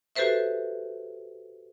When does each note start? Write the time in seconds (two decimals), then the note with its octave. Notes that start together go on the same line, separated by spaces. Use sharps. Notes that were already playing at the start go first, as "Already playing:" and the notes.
0.16 F#4 G4 A4 B4 C5 E5